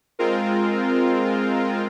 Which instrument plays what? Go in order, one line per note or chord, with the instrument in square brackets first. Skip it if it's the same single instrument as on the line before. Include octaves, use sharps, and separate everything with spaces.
[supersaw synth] G#3 C4 F4 A#4